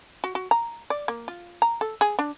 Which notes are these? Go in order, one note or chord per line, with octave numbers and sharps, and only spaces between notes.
F#4
F#4
A#5
D5
A#3
F4
A#5
A4
G#4
D4